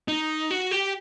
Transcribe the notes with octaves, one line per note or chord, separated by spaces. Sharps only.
D#4
F#4
G4